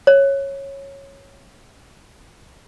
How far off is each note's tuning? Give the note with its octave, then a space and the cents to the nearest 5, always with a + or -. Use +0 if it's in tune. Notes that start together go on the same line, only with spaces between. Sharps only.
C#5 -10